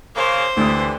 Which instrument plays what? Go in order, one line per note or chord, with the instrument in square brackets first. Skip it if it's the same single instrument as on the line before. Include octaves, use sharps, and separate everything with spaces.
[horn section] C#3 A#3 [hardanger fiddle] C5
[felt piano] D2 D#6 [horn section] D3 E3 G3